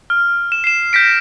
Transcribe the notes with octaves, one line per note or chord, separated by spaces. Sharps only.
F6
E7
C7 E7
G6 A#6 B6 D7